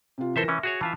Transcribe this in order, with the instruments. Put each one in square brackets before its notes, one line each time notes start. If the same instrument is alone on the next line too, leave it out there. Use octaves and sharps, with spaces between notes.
[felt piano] C3 F4
[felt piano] E3 A#4 A#6 [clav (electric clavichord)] A4 C5 E5
[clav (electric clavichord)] E3 C#4 [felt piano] E5
[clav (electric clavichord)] F#4 G#4 C#5
[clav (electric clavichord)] E3 F4 E5 [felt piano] A5